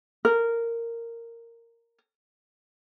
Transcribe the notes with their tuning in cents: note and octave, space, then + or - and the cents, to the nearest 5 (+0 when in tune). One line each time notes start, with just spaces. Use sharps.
A#4 -10